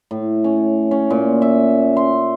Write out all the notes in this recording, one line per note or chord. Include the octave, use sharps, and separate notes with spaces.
A2
C#4
C#4
A#2
E5
C6